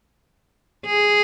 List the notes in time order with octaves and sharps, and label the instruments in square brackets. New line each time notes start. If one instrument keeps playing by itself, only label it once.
[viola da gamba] G#4